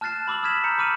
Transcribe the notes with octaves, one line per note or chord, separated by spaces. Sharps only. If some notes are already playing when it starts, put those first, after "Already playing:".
A5 F6 F#6 A6 C7 E7
B5 D6 E6 F#7
D#6 F6 G#6 B6 E7
A#5 G6 C#7
B5 D6 F6 D#7 E7